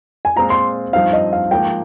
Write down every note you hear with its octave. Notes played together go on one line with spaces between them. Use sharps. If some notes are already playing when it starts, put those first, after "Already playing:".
G#5
A#2 G#3 C4 F4 G#4 A#5
C6
G2 F3 C4 D#4 F5
D#5
F5
G#2 F3 A#3 G5